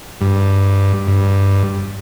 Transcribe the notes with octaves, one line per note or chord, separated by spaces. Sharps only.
G2
G2